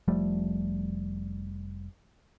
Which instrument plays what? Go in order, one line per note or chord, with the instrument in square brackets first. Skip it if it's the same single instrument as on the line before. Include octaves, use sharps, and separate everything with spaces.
[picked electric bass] F1 F3 G3 A3